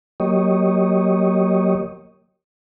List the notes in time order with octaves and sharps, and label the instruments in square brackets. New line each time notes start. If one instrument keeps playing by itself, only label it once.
[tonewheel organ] F#3 A#3 G4 C#5 D#5